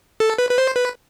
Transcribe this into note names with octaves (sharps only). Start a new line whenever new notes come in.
A4
B4
B4
C5
B4